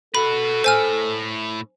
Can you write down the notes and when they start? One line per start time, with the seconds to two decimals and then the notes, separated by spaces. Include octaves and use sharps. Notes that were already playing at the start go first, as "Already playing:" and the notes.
0.15 F#4 A4 B4 B5
0.64 A2 C5 E5 G#5 F6